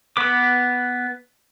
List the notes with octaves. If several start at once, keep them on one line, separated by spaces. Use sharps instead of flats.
B3 B4 D6